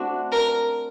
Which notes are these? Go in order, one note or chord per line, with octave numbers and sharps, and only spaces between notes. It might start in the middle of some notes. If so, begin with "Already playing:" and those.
Already playing: A3 C4 D4 F#4
A#4